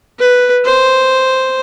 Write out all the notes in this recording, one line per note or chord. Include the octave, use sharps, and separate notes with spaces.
B4
C5